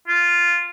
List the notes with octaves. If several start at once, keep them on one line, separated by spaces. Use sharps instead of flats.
F4